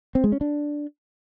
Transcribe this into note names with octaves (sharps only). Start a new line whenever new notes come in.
C4
G#3
C#4
D4